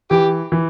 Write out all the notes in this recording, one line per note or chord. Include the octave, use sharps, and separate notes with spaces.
E3 G4
E3